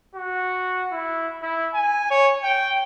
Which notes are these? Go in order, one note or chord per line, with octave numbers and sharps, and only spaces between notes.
F#4
E4
E4
G#5
C#5
G5